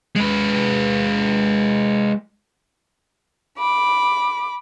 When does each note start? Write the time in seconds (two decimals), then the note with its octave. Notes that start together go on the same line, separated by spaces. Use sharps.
0.15 G#3 B4
3.58 B5 D6